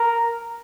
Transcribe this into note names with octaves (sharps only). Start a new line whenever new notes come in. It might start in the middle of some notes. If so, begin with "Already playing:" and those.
Already playing: A#4